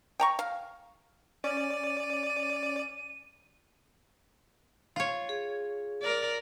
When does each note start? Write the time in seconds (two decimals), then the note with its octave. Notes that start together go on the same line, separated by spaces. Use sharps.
0.20 G5 A#5 C#6
0.39 F5
1.44 C#4 D5 D#7
4.96 F4 C#5
5.29 G#4
6.02 A#4 D5